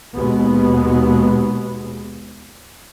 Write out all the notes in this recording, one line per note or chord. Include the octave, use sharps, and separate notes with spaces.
D#2 B2 G#3 B3